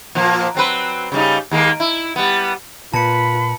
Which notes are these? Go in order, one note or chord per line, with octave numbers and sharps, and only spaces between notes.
A#2 F3 A#3
F#3 C4 B4
C#3 G3 D#4
D#2 G#3 A#3
E4
G3 B3
A#2 F4 B4 A5 B5 C#7